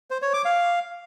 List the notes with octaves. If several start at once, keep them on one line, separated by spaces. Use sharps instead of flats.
C5
C#5
D6
F5